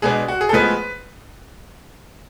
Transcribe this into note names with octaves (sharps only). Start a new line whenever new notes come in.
B2 G#3 B3 D4 G#4
F#4
G#4
A4
A2 F3 G#3 B3 B4